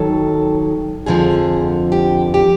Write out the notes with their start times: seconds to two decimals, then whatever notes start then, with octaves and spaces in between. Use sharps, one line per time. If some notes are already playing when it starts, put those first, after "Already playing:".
Already playing: D#2 D#3 F#3 A4
1.06 F2 D3 F3 G#4
1.92 G4
2.34 G4